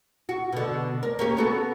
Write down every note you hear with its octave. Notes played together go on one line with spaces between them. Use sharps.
F#4
B2 D3
A#4 D5
A#3 C#4 G4
B3 F#4 A4